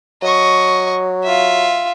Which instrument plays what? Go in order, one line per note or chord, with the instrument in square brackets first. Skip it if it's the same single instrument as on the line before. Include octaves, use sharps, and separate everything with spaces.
[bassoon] F#3 [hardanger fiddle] D#5 C#6
[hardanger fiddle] F4 E5